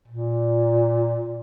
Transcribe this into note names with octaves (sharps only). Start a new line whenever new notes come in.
A#2